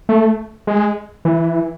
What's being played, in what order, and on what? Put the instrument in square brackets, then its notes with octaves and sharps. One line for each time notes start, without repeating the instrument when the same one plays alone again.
[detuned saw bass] A3
G#3
E3